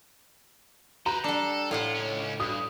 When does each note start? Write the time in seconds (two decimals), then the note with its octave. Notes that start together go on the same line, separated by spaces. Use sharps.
1.06 B4 C5 A#5
1.24 G3 D4 A4
1.71 A2 E4 F4 F#5
1.95 C#2 C#4
2.40 G2 D#6